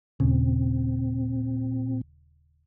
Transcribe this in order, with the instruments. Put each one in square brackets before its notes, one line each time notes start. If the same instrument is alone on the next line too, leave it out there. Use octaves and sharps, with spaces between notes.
[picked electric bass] D#1 C#3 [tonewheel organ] A#2 C4